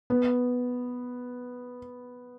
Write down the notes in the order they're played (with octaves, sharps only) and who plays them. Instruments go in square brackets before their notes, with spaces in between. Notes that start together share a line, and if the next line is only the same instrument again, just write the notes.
[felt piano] B3